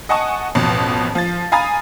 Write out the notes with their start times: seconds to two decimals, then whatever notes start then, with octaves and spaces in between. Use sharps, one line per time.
0.09 D#5 F#5 G#5 A5 C#6 D#6
0.55 A1 F2 B2
1.15 F3 A6
1.52 F5 G#5 A#5 B5 D#6 A6